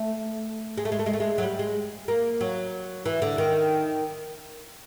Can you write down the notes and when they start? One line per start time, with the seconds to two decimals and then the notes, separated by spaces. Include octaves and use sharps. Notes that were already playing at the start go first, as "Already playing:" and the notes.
Already playing: A3
0.77 G#3
0.85 A3
0.92 G#3
0.99 A3
1.06 G#3
1.13 A3
1.20 G#3
1.38 F#3
1.43 G3
1.59 G#3
2.08 A#3
2.41 F#3
3.06 E3
3.22 D3
3.38 D#3